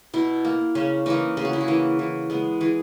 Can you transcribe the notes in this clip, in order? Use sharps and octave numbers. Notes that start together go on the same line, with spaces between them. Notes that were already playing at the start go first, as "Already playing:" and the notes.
B2 E4
A#3
C#3 C#4
E3 A#3 D#4
C#3 G#4
F#4
E4
F#4
E3 A#3
E3
G#3 B3
E3 G#4